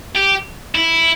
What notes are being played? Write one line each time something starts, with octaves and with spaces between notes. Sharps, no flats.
G4
E4